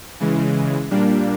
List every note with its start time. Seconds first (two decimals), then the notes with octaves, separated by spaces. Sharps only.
0.20 C#3 E3 G#3
0.91 A#2 G3 A#3 D4